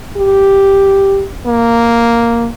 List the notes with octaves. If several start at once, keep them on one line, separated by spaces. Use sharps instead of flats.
G4
A#3